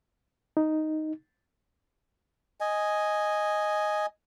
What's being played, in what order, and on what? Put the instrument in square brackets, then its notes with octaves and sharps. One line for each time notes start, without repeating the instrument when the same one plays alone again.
[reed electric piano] D#4
[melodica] D#5 G#5